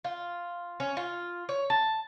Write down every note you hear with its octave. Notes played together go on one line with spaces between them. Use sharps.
F4
C#4
F4
C#5
A5